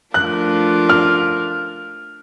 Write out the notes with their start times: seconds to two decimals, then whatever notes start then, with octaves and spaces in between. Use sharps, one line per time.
0.14 F3 A3 D4 F4 A#4 F#6
0.89 F6